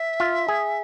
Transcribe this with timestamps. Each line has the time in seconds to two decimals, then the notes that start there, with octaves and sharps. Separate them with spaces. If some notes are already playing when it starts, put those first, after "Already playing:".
Already playing: E5
0.20 F4
0.48 G#4